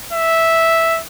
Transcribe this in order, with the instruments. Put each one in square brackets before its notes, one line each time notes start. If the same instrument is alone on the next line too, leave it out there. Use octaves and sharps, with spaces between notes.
[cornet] E5